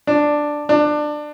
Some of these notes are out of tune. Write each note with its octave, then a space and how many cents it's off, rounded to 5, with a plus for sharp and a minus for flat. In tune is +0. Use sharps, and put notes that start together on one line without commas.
D4 +5
D4 +20